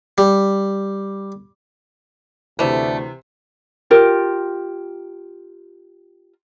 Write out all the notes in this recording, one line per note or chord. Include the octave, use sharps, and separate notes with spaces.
G3
D2 C3 E3 G3 A3 C5
F4 G4 A#4